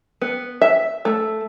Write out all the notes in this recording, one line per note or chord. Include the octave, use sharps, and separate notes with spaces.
B3
E5
A3